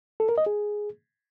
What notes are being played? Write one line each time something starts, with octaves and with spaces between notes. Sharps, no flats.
A4
A#4
D#5
G#4